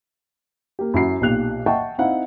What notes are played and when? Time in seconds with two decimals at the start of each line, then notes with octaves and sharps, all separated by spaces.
0.79 A#3 G4
0.94 F#2 E4 F#4 B5 C7
1.21 B1 A#2 G4 F#6 F7
1.66 D#5 E5 F#5 G5 A5 C#6
1.98 C4 D#4 E4 F5 F#5